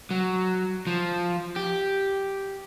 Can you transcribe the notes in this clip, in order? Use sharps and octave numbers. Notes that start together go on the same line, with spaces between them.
F#3
F3
G4